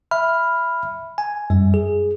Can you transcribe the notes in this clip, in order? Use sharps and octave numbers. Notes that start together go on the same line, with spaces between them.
E5 B5 F6
G#5
F#2 G3
G#4